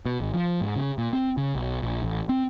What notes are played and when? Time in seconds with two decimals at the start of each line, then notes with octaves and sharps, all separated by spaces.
0.06 B2
0.20 G#1
0.34 F3
0.61 G#2
0.76 C#3
0.98 A#2
1.13 C4
1.37 C#3
1.55 B1
1.82 A#1
2.03 A1
2.29 C4